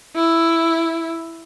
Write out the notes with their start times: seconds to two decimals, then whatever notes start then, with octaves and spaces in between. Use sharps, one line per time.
0.16 E4